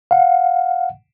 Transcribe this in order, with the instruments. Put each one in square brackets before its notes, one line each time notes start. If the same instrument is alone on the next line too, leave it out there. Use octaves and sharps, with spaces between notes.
[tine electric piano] F5 F#5